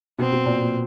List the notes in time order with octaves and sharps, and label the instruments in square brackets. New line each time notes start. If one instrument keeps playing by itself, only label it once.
[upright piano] B2 [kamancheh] C4
[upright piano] B2
A#2
A#2